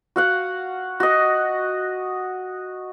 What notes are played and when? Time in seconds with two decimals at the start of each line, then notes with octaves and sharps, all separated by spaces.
0.16 F#4 F5 F#5
1.00 F#4 D#5